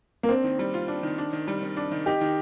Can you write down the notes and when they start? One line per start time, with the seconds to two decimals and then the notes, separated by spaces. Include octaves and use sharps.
0.23 A#3
0.29 C4 D4
0.44 D#3
0.59 G3
0.74 F4
0.88 D4
1.03 D#3
1.18 D4
1.33 D#3
1.48 G3
1.63 D#3
1.77 D4
1.91 D#3
2.06 D#4 G4
2.21 D#3